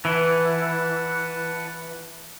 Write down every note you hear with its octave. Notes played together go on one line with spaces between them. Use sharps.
E3 B4 F#5 A5